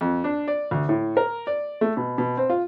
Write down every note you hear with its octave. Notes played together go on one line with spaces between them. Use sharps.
F2
D4
D5
D2
A2
A#4
D5
A3
B2
B2
C4
F4